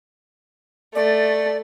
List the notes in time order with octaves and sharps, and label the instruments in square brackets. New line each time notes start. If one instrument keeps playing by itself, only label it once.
[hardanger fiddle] A3 [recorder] D5